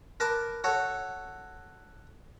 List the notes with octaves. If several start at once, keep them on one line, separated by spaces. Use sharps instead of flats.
A#4 B4 A5 D6
F#4 A4 C#5